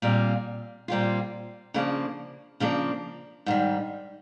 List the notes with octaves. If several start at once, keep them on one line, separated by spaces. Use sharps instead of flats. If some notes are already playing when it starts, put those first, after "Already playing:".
A#2 G3 C4 F4
A#2 G3 C4 F4
C#3 F3 A#3 D4
C#3 F3 A#3 D4
G#2 D#3 G3